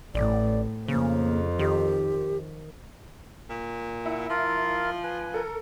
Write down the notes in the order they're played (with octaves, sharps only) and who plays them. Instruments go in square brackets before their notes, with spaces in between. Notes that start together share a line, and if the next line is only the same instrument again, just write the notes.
[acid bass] A1 [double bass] A2 [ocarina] D5
[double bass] F2 F3 [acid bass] C#3 [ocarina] A#3
[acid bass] D#3 [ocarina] G4
[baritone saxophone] A#2
[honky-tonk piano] E4 E5 [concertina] F#5
[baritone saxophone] F3 [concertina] F4 A#4 F5
[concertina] B4 G#5
[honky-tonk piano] A4 A#4